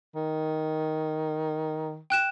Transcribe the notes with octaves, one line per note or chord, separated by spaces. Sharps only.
D#3
G5 F#6 E7